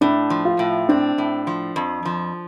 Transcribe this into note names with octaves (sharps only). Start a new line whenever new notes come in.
A2 D4
F3
F4
A2
C4 D4
A2
F3
F2
F3